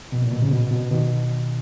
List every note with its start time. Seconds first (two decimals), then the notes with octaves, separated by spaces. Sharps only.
0.12 B2
0.22 A#2
0.32 B2
0.42 A#2 C#3
0.51 B2
0.71 B2
0.91 B2 D#3